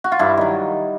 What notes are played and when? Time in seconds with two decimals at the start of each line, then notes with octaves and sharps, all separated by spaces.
0.04 F#4
0.12 F4
0.19 G2 E4
0.37 D#3 F#3